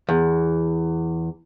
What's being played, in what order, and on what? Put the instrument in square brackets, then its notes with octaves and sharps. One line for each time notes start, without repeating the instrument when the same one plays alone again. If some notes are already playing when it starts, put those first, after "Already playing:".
[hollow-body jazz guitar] E2